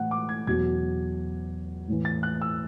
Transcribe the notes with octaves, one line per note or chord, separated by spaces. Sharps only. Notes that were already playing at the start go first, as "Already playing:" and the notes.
Already playing: A2 E3 F#5
D6
G#6
E2 B2 F#3 G#6
A2 E3
A6
F#6
E6